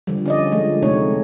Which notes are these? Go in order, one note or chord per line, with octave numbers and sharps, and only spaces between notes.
D3 F3 G3
C#4 D5 D#5
D3 F3 G#3 A3
C3 G#3 A3 C4 D#4 C#5